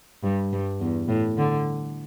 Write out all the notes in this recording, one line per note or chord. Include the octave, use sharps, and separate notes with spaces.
G2
G2
E2
A2
D3